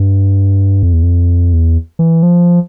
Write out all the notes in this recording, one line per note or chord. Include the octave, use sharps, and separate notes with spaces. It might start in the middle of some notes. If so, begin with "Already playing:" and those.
Already playing: G2
F2
E2
F2
E2
E3
F3